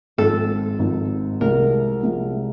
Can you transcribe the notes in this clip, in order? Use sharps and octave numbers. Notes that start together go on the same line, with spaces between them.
G#1 G#2 F3 A4
G#1 G#2 F3
C2 C3 F3 G#3 A#4
C2 C3 F3 G#3